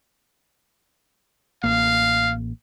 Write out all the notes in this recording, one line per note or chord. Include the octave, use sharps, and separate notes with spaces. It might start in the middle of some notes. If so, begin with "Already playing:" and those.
A1 A#3 F5